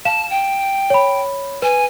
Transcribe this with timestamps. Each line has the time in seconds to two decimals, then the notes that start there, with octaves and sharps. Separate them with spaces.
0.05 F5 A5 E7
0.30 G5
0.90 C#5 B5
1.62 B4 G#5